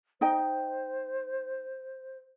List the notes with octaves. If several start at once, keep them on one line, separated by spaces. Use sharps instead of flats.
D#4 C5 D#5 G5